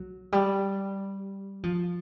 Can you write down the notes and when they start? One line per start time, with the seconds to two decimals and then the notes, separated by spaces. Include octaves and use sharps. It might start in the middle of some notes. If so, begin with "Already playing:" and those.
Already playing: F#3
0.32 G3
1.63 F3